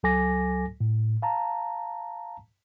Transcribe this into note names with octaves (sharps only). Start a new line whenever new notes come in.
C#2 F#3 A4 G#5 D6 A#6
A2
F5 A5 A#5